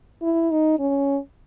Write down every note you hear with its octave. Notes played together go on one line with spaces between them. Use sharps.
E4
D#4
C#4